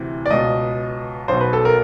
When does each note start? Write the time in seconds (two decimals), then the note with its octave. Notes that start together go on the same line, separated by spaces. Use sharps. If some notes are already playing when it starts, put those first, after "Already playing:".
Already playing: D2 C3 E3
0.26 D5
0.31 C#2 B2 D#5
1.28 B1 B2 C5
1.41 B4
1.53 A4
1.65 A#4